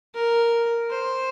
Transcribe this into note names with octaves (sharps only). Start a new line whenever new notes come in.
A#4
C5